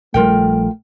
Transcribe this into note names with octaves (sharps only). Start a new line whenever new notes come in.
A#1 F3 G3 A3 F4 A#4 G5